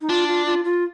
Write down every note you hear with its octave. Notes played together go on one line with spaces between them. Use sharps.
D#4
D4 F4
F4
F4
F4